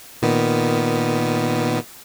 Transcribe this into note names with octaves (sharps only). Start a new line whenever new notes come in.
A#2 D#3 B3